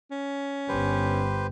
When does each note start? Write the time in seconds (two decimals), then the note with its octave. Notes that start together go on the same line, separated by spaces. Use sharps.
0.11 C#4
0.68 G1 G4 B4 C5